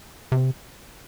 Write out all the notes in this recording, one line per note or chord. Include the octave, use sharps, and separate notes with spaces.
C3